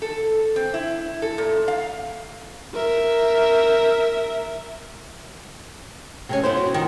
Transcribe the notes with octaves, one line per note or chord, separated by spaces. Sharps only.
A4
C4
E4
A4
A#2
F5
A#4 E5
C3 G#3 C#4
B3 E4 C5
F#4
D#3 F3